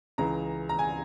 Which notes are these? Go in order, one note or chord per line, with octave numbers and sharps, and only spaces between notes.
C#2 C#3 E3 A#5
A#5
G#5